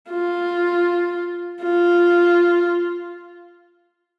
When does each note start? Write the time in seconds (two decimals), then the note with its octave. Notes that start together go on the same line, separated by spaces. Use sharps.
0.10 F4
1.62 F4